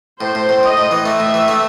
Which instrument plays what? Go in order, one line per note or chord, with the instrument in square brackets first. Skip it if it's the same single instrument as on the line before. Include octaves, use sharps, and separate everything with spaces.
[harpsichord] A2 [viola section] C5
[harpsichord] A2
A2
[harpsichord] A2 [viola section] D#5
[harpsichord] A2
E3
[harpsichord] A3 [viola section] E5
[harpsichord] A2
E3
A3